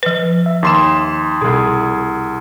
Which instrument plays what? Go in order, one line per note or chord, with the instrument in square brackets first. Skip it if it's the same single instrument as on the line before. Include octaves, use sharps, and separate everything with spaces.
[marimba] F3 B4
[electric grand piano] E5
D#2 C6 E7
[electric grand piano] C2 G#4 [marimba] B2